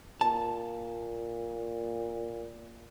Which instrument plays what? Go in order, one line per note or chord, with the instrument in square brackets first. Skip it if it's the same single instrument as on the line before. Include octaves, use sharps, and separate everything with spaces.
[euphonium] A#2 [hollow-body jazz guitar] A5